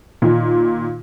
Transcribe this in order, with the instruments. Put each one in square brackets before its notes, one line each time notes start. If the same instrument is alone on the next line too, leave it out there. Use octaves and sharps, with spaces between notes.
[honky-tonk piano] A#2 D#3